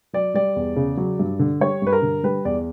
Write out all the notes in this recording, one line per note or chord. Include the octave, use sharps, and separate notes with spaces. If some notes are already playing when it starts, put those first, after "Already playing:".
F#3 D5
G3 D5
E2
C#3
F#3
G2
D3
G3 C#5
G2 B4
A#4
D3
G3 B4
E2 D5